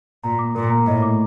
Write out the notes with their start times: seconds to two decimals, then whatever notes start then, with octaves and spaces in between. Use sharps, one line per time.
0.24 A#2 A#5
0.39 D6
0.55 A#2 A#4
0.70 A#5
0.86 A2 D#5
1.02 D6